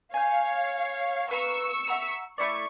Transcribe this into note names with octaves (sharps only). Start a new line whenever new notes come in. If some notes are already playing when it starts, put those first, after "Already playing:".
C#5 F5 G#5 G6
B4 F5 A#5 C#6 E6 C#7
E5 F#5 A#5
A3 E4 D5 C#6